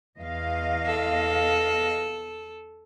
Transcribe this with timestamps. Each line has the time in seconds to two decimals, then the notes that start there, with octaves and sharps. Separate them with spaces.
0.18 E2 D#5 F5
0.86 A4